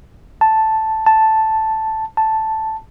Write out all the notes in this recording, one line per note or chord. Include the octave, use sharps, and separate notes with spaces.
A5
A5
A5